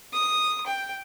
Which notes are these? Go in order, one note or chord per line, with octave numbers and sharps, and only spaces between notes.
D#6
G5